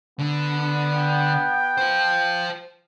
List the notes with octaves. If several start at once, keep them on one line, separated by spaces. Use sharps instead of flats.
D3 B3
G5
F4 C5